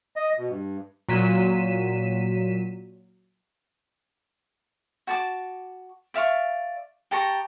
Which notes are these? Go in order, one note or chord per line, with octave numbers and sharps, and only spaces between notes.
D#5
B2
G2
A#2 F#3 B6 D#7 E7
F#4 A5 D6
D5 E5 F5 C#6
G4 A5 A#5 C#6